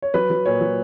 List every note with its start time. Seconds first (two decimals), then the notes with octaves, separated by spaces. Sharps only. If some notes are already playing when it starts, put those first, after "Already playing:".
0.02 C#5
0.14 F#3 B4
0.30 F#3
0.46 A#2 C#5
0.61 F#3